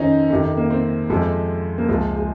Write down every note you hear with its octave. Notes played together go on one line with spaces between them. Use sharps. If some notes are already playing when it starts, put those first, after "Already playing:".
Already playing: F2 D#3 C#4 D#4 C5
F2 C3 D#3
A#3
C4
F2 C3 F3 G#3
A#3
C#2 C3 F3 G#3
G#3